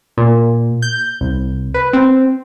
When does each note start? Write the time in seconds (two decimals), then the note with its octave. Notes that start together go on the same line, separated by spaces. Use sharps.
0.18 A#2
0.82 G6
1.21 C2
1.74 B4
1.93 C4